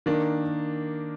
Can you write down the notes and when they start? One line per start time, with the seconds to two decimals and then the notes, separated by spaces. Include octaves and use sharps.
0.06 D#3 A#3 D4